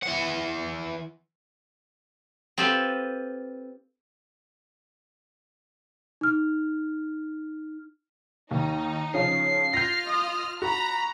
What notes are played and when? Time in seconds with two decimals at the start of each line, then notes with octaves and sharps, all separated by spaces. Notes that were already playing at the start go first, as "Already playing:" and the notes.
0.03 E3 F#5
2.58 C4 F4 G4 A4 B4
6.21 D#4 F6
8.51 D#2 D#4
9.14 C#3 F3 C#4 C7
9.74 F4 F6 G6 A#6
10.06 D#5 D#6
10.62 F#4 A#5 B5